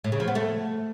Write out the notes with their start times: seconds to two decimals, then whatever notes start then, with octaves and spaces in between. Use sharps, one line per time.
0.04 A2
0.12 C#3
0.20 F3
0.28 B3
0.35 A3